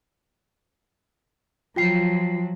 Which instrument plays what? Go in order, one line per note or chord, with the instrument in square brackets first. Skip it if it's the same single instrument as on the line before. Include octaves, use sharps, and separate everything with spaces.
[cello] F3 F#3 [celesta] F4 G5 C7